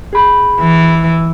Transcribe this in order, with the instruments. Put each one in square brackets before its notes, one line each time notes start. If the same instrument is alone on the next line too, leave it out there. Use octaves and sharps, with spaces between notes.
[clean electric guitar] G#4 B5
[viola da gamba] E3